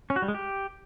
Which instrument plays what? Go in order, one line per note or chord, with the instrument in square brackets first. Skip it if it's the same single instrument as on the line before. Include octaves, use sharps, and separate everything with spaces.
[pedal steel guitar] C#4
F#4
G3
G#3
G4